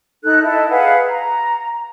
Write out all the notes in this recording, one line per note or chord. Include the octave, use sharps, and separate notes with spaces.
D#4 A4 F#6
E4 A4 D#5 E5
G#4 B4 F5 F#5
A#5